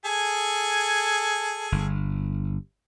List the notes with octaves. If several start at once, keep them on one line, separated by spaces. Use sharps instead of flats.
G#4 A4 G#5
G1